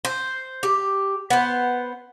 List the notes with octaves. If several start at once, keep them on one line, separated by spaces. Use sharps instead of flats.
C5
G4
B3 C5